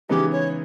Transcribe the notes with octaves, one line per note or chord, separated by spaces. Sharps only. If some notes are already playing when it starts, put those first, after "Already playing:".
C#3 E3 G#3 B3 D#4 G4
C#5